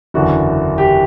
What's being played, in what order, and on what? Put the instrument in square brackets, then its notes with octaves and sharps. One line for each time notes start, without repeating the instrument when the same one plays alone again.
[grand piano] F#1 E2 D3 F#4
G4